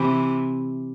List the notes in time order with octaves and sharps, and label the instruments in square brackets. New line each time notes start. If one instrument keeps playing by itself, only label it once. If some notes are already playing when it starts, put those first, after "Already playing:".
Already playing: [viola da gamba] C3 E3